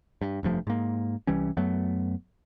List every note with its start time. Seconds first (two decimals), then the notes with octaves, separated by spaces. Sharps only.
0.21 G2
0.43 F1 G2 F3 A3
0.67 G#2 A#3
1.27 C2 E3 G3 C#4
1.57 F#2 F#3 A3 B3